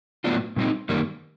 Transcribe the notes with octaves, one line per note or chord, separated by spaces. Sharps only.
A2 F#3 B3 D4 F4
A#2 G3 C4 D#4
F#2 D#3 G3 A#3